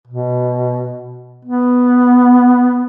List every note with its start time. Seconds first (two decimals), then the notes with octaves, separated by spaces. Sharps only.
0.07 B2
1.45 B3